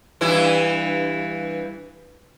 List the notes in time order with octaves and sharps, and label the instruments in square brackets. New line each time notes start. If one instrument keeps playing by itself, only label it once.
[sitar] G2 E3 E4